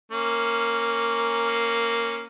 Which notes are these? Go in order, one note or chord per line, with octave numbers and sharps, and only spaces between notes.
A#3 C#4